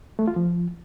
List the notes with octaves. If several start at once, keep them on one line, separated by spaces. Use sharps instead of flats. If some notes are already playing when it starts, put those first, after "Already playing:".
A3
F4
F3